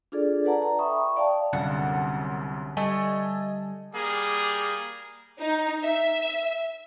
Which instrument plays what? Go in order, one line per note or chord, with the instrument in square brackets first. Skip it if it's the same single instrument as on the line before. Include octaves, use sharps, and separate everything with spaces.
[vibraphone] D4 F4 G#4 A4 D5
A4 B4 D5 F#5 A5 A#5
A#5
E5 G5 B5 C#6 D#6
D5 F5 G5 A5
[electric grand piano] C2 F#2 A5 [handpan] D3 [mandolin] F#5
[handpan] G3 [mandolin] A3 [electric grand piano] D#5 G#5 A5
[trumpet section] G3 A#3 G#4
[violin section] D#4
E5